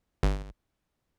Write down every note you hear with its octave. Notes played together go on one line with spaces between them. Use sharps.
G1